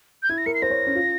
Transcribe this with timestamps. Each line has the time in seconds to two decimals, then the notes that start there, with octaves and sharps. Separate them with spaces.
0.23 G6
0.29 E4 G#6
0.38 A#6
0.46 A#4 C#7
0.54 C7
0.62 C5 A#6
0.70 C#5
0.87 C#4
0.95 F4